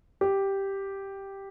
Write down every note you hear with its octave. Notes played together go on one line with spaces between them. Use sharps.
G4